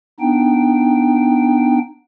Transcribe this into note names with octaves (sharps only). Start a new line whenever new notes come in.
B3 D4 D#4 G5